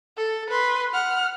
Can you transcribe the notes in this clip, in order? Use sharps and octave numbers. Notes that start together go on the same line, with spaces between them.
A4
B4 C6
F#5 F6